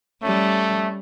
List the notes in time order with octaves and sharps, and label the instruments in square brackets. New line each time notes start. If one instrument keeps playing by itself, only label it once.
[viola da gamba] G3 C#4 [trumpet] A3